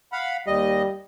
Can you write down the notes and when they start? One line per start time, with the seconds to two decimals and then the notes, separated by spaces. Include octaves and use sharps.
0.12 F5 F#5 B5
0.47 D#2 G3 D#5